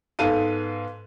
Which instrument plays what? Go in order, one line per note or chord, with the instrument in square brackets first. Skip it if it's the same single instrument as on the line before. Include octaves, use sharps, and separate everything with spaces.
[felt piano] G#2 B3 A4 B4 F5 D#7